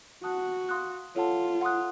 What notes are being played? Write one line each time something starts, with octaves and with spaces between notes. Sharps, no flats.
F#4 F#5 A5 D#6 F#6
F5 C6 D#6 F#6
F4 A4 C#5 F#5 A5
F#5 C6 D#6 F#6